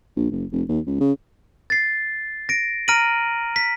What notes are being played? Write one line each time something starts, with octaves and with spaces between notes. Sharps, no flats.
A#1
F#1
F1
D#2
C#2
C#3
A6 C7
A#6 D7
A#5 F6 A#6 D7 D#7 F#7
B6